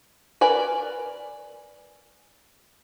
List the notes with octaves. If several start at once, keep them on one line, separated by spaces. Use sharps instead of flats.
A#4 B4 D5 G#5